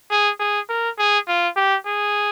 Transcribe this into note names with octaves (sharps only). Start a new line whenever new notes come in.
G#4
G#4
A#4
G#4
F4
G4
G#4